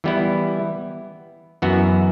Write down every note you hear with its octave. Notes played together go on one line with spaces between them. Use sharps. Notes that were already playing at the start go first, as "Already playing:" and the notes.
E3 G3 B3 E4
F#2 E3 B3 F#4